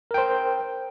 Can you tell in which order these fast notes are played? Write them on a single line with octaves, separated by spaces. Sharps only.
A#4 G5 C5